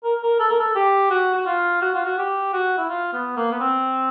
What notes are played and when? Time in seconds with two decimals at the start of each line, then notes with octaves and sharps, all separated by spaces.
0.04 A#4
0.23 A#4
0.39 A4
0.49 A#4
0.60 A4
0.75 G4
1.10 F#4
1.34 F#4
1.46 F4
1.82 F#4
1.94 F4
2.05 F#4
2.18 G4
2.53 F#4
2.77 E4
2.89 F4
3.13 B3
3.36 A#3
3.52 B3
3.60 C4